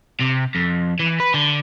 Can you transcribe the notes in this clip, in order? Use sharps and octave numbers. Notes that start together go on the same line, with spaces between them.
C3
F2
E3
B4
D3